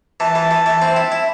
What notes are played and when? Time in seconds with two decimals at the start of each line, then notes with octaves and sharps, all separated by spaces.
0.20 E3 A5
0.35 E3
0.51 E3
0.66 E3
0.82 C4
0.96 E4
1.12 E4